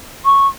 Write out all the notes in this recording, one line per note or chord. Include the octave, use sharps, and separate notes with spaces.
C#6